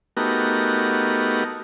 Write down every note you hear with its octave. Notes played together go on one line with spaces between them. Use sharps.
A3 B3 D#4 F#4 G4 A#4